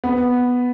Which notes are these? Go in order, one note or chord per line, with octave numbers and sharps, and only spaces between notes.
B3